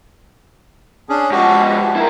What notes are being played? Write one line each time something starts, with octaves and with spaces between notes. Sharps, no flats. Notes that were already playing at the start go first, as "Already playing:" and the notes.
C#4 D4 G#4
G#2 F3 F#4 G4
B3
E4 A#4